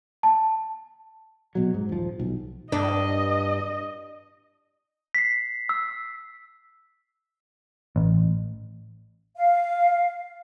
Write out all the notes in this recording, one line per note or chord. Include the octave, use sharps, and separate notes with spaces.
A5
A#1 B2 F#3
G#2
D#1 F3
B1
G2 D4 D#5
B6 C7
E6
A1
F5